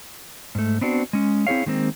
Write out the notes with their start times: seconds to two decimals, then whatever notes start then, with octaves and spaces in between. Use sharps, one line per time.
0.55 G#2 A3
0.81 B3 C4 D4 F#4
1.13 G#3 C#4
1.47 C4 E4 G#4 C#5 F5
1.66 D#3 G#3 A#3 C4